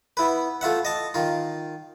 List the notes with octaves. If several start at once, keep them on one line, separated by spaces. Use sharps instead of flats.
B3 E4 B4
A3 F4 E5 F#5
D#5 A5
D#3 F4